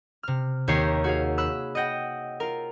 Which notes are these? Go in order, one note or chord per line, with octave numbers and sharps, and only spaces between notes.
C3 F6
D#2 D#3 G4 C#5 A#5 C7
F#4 G#4 F5
B5 E6 F#6
D#5 F#5 G5 A#6
F4 A#4